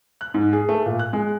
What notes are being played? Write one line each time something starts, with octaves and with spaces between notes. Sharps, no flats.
F#6
G#2
G#4
A3
A#2
F#6
G#3